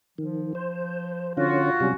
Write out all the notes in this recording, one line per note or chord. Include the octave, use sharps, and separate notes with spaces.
D#3 F3
C5
D3 C#4 F4 F#4
C3 F#3 G3 C#4